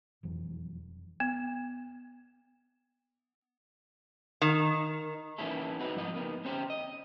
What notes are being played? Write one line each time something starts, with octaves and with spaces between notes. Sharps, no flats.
E1 F2 E3 F#3
B3
D#3
E3 A#3 C#4 D#4 E4 A4
C4 D#4 F#4 B4
G#2 F3 E4 D#5
A#3 B3 D#4
C4 C#4 G4 C5
D#5